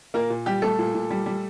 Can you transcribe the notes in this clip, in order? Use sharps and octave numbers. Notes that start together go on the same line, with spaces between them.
A#2 A#3 A#4
A#2
G3 G4
G3 A3 A4
A#2
A#2
G3
G3